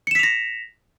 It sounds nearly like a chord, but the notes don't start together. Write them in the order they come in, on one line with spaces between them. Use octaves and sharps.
C#7 E7 B6 F7 A#6